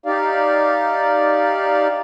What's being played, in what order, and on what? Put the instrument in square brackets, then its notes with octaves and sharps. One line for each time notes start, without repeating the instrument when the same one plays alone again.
[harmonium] D#4 G4 D5 F5